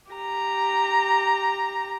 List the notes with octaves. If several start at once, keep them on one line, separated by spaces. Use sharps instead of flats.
G4 A#5